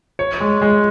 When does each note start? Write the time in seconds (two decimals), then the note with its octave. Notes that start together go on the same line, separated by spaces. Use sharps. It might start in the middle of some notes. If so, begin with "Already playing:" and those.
0.19 C#5
0.40 G#3
0.62 G#3